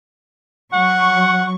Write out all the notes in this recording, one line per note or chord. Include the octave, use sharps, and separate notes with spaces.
F#3 F#5 C#6